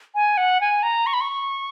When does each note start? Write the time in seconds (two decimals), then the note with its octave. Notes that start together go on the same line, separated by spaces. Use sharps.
0.15 G#5
0.37 F#5
0.61 G#5
0.83 A#5
1.06 C#6
1.13 B5
1.21 C#6